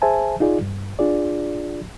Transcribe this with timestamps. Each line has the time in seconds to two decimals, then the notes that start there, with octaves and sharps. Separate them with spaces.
0.02 G#4 C5 E5 G#5 A5
0.40 D#4 F4 G#4 D5
0.61 G2
0.99 D4 F4 G#4 D5